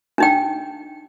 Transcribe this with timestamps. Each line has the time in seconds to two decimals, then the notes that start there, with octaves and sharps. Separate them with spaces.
0.18 D4 D#4 G5